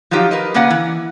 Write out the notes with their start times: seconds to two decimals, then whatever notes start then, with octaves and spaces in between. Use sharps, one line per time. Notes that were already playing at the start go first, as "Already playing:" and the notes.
0.11 F3 F#3 D#4 F4 G4
0.31 A#4 B4 D#5
0.54 C#3 A#3 B4 D5 F#5
0.70 E3